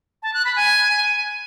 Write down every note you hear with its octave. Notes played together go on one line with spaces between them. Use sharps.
A5
F#6
B5
G#5